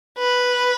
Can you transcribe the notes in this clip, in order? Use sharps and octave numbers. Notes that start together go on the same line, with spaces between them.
B4